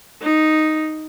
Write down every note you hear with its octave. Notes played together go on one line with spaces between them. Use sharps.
D#4